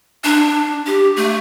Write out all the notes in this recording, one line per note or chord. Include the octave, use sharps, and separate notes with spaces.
D4
G4
A3